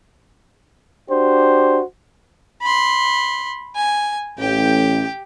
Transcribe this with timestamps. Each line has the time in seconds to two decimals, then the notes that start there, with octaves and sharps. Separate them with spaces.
1.09 D4 F#4 G4 C5
2.62 B5 C6
3.76 G#5
4.39 A1 G4 G5